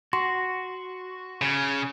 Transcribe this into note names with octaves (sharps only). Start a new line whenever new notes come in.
F#4 C6
C#3